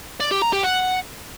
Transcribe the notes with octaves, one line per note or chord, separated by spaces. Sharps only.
D5
G4
A#5
G4
F#5